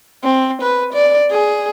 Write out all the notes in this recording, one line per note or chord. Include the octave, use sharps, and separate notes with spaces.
C4
B4
D5
G#4